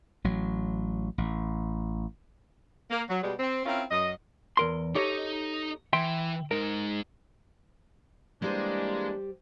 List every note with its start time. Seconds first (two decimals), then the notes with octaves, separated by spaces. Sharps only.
0.24 A1 F#3
1.18 A1
2.90 A#3
3.08 F#3
3.22 B2 G3 G#3
3.40 C4
3.66 C4 C#4 E4 F4 A#4
3.91 F#2 D#5
4.57 E2 A#4 C6
4.95 D#4 G4 A4 C#5 D#5
5.93 E3 E5 G5 C6
6.51 G#3 D#4 A#4
8.42 E3 G3 G#3 A#3 D4 G4 C5